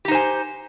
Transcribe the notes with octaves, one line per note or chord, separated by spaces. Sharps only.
D#4 G4 C5 G#5